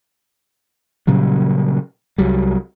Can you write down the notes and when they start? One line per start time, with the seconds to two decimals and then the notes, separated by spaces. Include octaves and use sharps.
1.07 A#2 C#3 F#3 G3
2.18 C2 F#3 G3